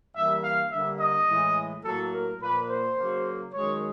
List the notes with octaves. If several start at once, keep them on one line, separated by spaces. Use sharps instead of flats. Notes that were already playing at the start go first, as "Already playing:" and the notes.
G2 E3 G3 A#3 E5
F5
G2 D3 G3 A#3 E5
D#5
A2 E3 G#3
A2 F#3 A#3 A4
A#4
A#2 F3 A#3 B4
C5
C#3 F#3 A#3
F#2 D#3 G#3 C#5